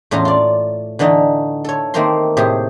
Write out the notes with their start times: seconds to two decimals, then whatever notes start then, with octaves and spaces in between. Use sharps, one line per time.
0.11 E2 A2 C#4 F4 A#5
0.25 F4 D5
0.99 D3 E3 A3 D#4
1.65 A4 C#5
1.94 D#3 A3 A#3 C4 A#4 C6
2.37 A2 C3 G4 G#4